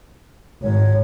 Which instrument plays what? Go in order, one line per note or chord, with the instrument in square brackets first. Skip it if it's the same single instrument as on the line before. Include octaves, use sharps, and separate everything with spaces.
[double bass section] G#1 [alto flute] C#5